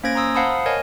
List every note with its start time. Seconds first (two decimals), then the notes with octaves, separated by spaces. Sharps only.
0.04 A#3 C#4 C5 G#6 A#6 D7
0.15 A#5 C6 D#6 E6
0.35 C5 F5 F#5 A5 B5 D#6
0.66 A#4 C#5 D#5 G#5